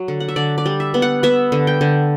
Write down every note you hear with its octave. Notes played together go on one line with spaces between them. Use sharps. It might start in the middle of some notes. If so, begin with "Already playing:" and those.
Already playing: F#3
D3
F#5
E5
D3 D5
D5
G3
E5
B3
F#5
B3 E5
D3
G5
D3